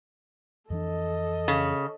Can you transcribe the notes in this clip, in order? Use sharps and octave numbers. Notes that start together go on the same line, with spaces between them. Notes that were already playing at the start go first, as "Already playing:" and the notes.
F2 E3 D4 A4 D#5
C#3